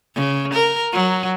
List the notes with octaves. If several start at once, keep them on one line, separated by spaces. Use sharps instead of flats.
C#3
A#4
F#3